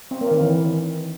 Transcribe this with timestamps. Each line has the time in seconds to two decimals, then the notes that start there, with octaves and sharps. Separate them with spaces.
0.11 C4
0.21 A#3
0.31 D#3
0.41 E3